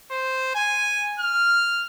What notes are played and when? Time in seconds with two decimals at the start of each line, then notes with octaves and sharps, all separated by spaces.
0.11 C5
0.55 G#5
1.20 F6